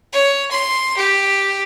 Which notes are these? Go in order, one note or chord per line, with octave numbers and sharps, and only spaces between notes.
C#5
C6
G4